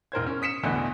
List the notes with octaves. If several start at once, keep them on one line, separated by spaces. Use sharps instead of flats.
E1 A#4 C5 G#6
C#4
D#6 B6 C#7 E7
A1 E2 B2 D3 E3